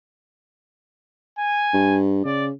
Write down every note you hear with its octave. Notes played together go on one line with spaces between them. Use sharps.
G#5
G2
C#3 D5